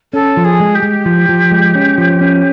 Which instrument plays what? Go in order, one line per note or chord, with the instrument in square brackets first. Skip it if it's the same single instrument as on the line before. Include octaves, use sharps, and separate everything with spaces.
[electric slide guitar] C#4 [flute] A4
[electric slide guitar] F3
[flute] G#4
[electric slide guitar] G#3
[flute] G4
[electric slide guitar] G#3
F3
F3
G#3
C#4
F3
C#4